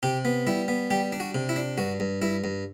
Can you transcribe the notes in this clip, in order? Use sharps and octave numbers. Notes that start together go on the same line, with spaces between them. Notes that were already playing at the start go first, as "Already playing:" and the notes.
C3 G4
B3
G3 E4
B3
G3 G4
D4
F#4
C3
E4
D4
G2 F#4
G2
G2 E4
G2